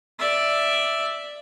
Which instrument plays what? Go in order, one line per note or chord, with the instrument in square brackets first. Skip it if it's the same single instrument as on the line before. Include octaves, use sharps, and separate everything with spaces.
[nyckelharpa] D5 E5